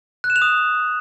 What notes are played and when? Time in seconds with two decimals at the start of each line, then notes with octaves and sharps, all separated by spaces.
0.24 F#6
0.30 E7
0.36 F7
0.42 D#6